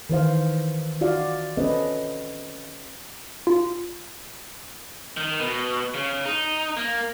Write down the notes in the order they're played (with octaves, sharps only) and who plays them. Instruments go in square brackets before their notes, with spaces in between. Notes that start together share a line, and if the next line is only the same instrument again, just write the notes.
[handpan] D#3 E3 C5 F5
F4 F#4 D5 F5
C4 C#4 A4 B4 D#5
[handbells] F4
[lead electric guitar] D#3
B2
C#3
D#4
A#3